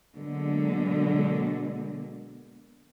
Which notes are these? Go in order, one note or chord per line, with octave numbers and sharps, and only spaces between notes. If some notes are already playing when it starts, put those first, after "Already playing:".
B2 D3 F#3 G#3 A#3